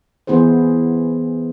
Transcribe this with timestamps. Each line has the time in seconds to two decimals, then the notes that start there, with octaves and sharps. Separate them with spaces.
0.27 E3 B3 E4 G#4 C5